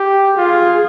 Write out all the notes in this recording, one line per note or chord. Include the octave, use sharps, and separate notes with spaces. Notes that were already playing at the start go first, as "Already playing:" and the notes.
Already playing: G4
F4 G#4